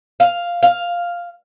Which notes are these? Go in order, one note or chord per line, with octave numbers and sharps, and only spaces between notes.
F5
F5